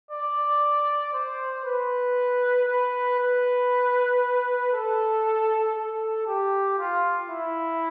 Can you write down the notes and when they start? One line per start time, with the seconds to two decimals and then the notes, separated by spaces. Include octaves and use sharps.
0.11 D5
1.13 C5
1.65 B4
2.68 B4
3.19 B4
4.73 A4
5.76 A4
6.27 G4
6.79 F4
7.30 E4